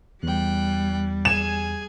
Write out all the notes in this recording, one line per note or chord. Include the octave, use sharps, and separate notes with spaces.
E2 G3 G5 F#6
G#4 G#5 E7